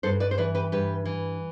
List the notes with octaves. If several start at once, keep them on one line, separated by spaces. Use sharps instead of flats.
G2 A4 C5
B4 D5
C5
E3 B4 D5
G4 B4
G2 G4 B4
E3